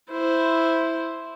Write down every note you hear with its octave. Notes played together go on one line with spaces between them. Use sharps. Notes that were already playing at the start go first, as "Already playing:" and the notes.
E4 C5